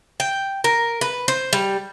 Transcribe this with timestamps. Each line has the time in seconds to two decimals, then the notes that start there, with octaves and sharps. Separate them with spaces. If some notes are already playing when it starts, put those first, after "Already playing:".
0.20 G5
0.64 A#4
1.01 B4
1.28 C5
1.53 G3